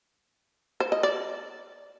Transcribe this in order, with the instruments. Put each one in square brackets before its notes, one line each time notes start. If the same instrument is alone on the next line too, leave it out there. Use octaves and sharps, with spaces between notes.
[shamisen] C5
D#5
D5